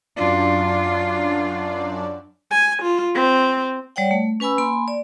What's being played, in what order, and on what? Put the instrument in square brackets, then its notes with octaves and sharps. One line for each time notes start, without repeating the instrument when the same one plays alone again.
[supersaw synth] F#2 D4 D5 [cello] F4
[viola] G#5
F4
C4
[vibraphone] G3 C#5 D5 F#5 G5
A3
C#4 B4 G#5 B5 E6
A#3 G#5 B5 C6
D5